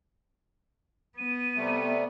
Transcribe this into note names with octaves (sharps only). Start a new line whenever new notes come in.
B3 D#7
C3 G3 A3